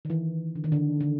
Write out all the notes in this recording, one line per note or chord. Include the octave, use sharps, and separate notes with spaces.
D#3
E3
D3
D#3
D3
D3